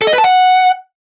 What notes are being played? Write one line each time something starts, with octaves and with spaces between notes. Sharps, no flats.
A4
D#5
B4
A5
F#5